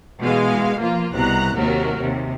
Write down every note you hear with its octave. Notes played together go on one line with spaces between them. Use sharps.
B2 E3 G#3 F5
F3 A#3 F4
C2 B2 A#5 F#6
D#2 C3 F#3 A#4
D#2 C3